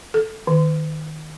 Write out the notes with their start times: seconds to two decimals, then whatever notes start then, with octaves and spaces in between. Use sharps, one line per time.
0.14 A4
0.47 D#3